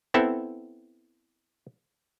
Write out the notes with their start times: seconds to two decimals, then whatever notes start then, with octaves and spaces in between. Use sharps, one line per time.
0.14 B3 C4 E4 A4